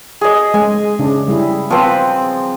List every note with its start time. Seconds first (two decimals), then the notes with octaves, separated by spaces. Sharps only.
0.21 G#4 D#5
0.54 G#3 G#5
0.99 C#3 D4
1.28 G3 E4
1.70 F3 B3 C4 B4 C5